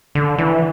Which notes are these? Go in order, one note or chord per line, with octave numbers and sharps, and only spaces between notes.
D3
E3